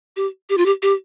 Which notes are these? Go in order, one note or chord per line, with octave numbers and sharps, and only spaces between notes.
G4
G4
F4
G4
G4